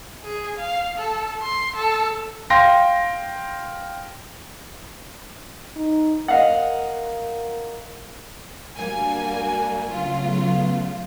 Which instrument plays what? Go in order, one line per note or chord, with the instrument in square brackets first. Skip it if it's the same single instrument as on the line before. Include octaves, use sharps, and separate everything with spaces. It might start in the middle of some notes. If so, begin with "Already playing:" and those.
[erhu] G#4
F5
A4
C6
A4
[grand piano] F5 G5 C6 A#6
[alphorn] D#4
[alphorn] A#4 [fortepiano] D#5 F5 F#5
[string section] G3 A#3 G#5 [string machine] D4 F#4
[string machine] C#3 A3 B3 [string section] F#3 F4